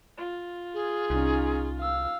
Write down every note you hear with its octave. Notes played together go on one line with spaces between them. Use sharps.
F4
G#4
C2 C#4 D#4
F5 E6